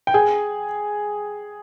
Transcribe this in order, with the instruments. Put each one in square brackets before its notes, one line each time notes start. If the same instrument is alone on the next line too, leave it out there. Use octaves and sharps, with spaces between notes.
[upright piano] G5
G#4 G#5